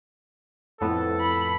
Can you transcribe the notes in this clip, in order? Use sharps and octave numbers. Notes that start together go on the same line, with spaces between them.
F2 A2 B3 A4
B5